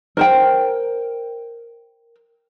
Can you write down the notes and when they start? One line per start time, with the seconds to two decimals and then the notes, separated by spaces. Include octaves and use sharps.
0.17 A#4 C5 G5